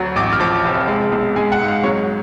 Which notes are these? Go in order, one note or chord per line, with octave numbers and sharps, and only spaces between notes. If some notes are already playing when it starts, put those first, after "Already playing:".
Already playing: D2 F#3
A1 D6
F6
F3 D6
F1
G#3
B1
G#3 G#5
F#5
G#2
F5
F#3 C#5